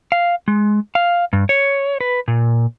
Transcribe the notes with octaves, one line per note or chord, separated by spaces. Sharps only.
F5
G#3
F5
G2
C#5
B4
A#2